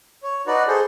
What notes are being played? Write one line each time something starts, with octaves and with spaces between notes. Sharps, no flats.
C#5
D#4 F#4 B4 D5
G#4 A4 C5